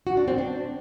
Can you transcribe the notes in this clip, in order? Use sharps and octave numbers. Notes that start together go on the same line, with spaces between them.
F#4
D4
C4
D4